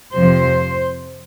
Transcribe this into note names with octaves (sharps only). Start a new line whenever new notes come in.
F2 C3 F3 C5